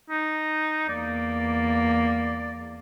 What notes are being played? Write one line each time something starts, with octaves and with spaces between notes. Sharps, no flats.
D#4
E2 A#3 D5